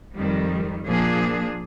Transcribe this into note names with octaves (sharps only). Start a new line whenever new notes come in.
F2 D#3 G3
A#2 F3 A#3 D4 G#4